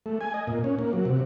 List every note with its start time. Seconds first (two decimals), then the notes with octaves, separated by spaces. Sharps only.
0.06 A3
0.21 G#5
0.34 D#5
0.47 A#2
0.64 C#4
0.79 A#3
0.93 F#3
1.05 C3